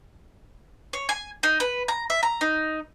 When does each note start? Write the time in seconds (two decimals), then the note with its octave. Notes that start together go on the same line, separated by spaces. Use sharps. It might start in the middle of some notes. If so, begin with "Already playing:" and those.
0.93 C#5
1.09 G#5
1.43 D#4
1.60 B4
1.88 A#5
2.10 E5
2.23 A#5
2.41 D#4